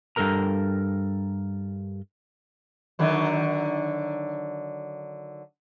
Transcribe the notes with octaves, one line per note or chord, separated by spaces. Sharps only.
G2 G#3 A4 A#4 A#5
D3 D#3 F#3